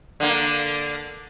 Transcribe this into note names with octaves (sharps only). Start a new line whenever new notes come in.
D3 A#3